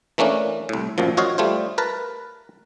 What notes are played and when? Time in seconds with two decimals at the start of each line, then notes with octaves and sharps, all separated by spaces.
0.18 E3 A3 A#3 C#4 D4
0.69 C2 A2
0.98 A1 F#2 A#2 F3
1.17 F4 F#4 C#5 D#5 F5
1.38 G3 A3 F4 C5
1.78 A#4 B4 A5